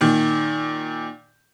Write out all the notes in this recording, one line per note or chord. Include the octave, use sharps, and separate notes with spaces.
A#2 D#3